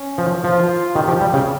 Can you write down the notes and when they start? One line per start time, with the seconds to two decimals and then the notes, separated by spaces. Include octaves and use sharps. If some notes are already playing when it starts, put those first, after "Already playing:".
Already playing: C#4
0.18 F3
0.43 F3 F4
0.95 D#3 G4
1.08 F3
1.21 G3
1.33 C#3